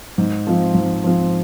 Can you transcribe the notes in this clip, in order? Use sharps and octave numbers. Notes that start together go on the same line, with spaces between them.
G#2
F3 C4 F4
G#2
F3 C4 F4